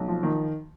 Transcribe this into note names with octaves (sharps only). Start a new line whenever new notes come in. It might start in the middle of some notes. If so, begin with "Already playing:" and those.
Already playing: B1
F3
D#3